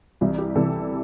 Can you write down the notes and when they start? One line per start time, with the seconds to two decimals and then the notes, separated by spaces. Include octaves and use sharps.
0.21 C2 C3 E3 G3 E4
0.38 G4
0.55 C2 C3 E3 G3 A4